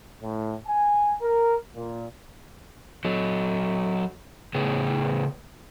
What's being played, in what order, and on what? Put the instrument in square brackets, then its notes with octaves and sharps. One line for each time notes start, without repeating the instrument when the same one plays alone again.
[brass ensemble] A2
G#5
A#4
A#2
[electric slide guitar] F#3 A4
A2 C#3 B3 G#4